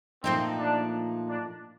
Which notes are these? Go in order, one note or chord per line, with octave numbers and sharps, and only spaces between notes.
A#2 F3 A3 C4 D#4
D4
D4